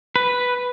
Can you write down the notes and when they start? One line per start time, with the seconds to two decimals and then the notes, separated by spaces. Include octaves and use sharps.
0.16 B4